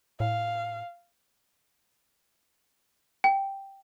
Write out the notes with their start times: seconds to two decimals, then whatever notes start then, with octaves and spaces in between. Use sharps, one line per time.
0.20 A2 F5
3.24 G5